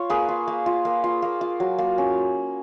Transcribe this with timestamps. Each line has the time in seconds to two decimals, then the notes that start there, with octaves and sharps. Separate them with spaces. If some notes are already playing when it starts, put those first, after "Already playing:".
Already playing: F4 C#5 F5
0.10 A#3 G#4 B4
0.29 F4
0.48 A#3
0.66 F4
0.85 A#3
1.04 F4
1.22 A#3
1.41 F4
1.60 F#3
1.78 A#3
1.98 C#4